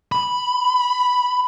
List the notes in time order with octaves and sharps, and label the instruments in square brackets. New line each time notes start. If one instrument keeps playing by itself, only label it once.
[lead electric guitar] B5